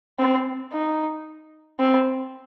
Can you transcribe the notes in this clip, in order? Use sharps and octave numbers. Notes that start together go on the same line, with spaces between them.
C4
D#4
C4